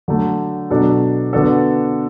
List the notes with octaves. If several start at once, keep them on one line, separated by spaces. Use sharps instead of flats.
D3 F#3 A3
B2 F#3 D4 F#4 A4
D3 B3 D4 F#4 A4